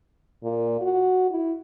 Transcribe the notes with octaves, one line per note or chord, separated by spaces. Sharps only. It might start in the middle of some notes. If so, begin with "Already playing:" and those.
A#2
F#4
E4